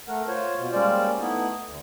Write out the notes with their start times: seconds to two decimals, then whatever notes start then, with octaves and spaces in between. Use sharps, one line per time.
0.08 A3 A#4 F#5
0.28 F4 C5 C#5
0.56 B2 F4
0.72 G3 G#3 A#3 C#4 C5 D5
1.19 A3 B3 D#4 E4
1.64 D2